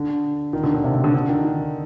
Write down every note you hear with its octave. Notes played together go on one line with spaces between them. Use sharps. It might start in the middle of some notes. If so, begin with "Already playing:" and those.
Already playing: D3
D#3
D3
D3
C3
C3
D3
D3
D#3
D#3